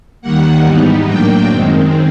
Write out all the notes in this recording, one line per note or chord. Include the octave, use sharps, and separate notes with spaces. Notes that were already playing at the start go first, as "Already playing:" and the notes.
D#2 D#3 G3 A#3 F#5
G#2 E3 G3 B3 D#4
A2 F#3 A#3 D4 G5
F#2 D#3 G#3 C4